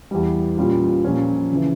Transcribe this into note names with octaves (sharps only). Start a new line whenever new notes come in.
E2 E3 G3
A#2 G3 C#4 F4
A#2 F3 C#4
C#3 E3